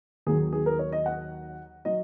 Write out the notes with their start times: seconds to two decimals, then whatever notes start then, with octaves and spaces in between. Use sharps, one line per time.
0.27 D#2 D#3 F#3 G#4
0.53 G#4
0.66 A#4
0.79 C#5
0.92 D#5
1.06 F#5
1.85 F#3 D#5